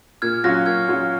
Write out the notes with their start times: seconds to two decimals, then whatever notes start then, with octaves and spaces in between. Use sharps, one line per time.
0.22 A#2 F6 G#6
0.44 F#3 C#4 F4 F#6 A#6
0.66 A#2 F6 G#6
0.88 F#3 C#4 F4